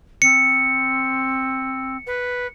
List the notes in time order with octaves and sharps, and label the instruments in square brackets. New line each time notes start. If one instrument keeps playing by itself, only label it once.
[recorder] C4 [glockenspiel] C#7
[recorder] B4